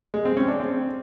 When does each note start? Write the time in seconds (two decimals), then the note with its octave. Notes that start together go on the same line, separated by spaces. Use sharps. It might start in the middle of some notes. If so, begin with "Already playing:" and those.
0.14 G#3
0.25 C4
0.37 C#4
0.48 D4
0.60 C4